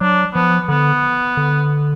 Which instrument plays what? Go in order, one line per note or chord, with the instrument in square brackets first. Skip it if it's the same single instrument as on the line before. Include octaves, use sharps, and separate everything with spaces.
[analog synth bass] F#3 [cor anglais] D4
[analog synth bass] F3 [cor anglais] B3
[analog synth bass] D3 [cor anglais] B3
[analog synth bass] D3